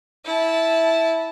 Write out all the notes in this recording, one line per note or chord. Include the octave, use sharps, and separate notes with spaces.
E4 A5